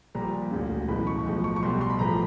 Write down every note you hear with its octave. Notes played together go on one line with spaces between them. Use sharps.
A#1 A#2 G3 A#5
E1 D2 C#3
B1 A2 E3 G#3 B5
C#6
B1 A2 F3 G#3
C#6
C#6
B1 B2 G3 C6
C6
B5
A1 A2 F3 G#3 A#5
B5